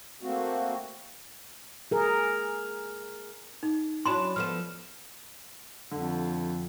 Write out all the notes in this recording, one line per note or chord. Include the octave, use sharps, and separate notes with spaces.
A3 A#3 C4 F#4
G#4 A#4
D#4
F#3 C#4 D4 E4 B5 C6 E7
F3 A3 B3 F6 E7
F2 D3